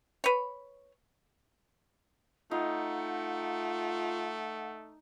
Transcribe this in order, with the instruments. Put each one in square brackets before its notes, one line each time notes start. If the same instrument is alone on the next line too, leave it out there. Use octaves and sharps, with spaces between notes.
[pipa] B4 C#5
[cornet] A3 [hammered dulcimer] D#4 [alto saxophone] F4 [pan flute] F#5